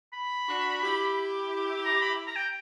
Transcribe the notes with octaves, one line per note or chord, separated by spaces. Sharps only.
B5
D4 F#4
E4 G4
A#5
B5
A#5
G5